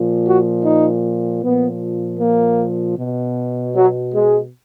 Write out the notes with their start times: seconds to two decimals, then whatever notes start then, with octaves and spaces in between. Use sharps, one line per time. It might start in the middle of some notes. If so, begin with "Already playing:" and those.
Already playing: A#2 F3
0.26 F#4
0.63 D#4
1.42 A#2 F3 B3
2.20 A#3
2.97 B2
3.75 F#3
4.14 G#3